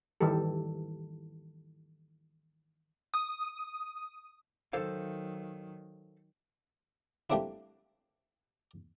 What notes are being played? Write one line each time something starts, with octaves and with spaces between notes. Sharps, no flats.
D#3 E3 G3 G4 A4
D#6
D#3 F#3 A4 C5 F5
G3 A3 A#3 C4 D4 E4